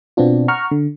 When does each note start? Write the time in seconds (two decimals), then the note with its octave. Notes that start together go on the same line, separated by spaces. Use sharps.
0.17 B2 B3 C4 D4 F4
0.48 F#5 A#5 C#6 F6
0.71 D3